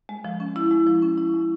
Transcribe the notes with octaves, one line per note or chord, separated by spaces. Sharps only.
G#3
F3
C#4
E4
G#3
F3
C#4
E4
G#3